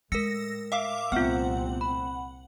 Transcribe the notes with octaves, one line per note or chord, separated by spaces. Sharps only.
A2 G#3 A#4 E6 A#6 C#7
E5 F5 D6
C2 A#2 A3 B3 C4 F4 F#5
B5